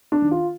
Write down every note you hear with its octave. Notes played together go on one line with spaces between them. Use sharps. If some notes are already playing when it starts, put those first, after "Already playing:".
D4
D#3
F4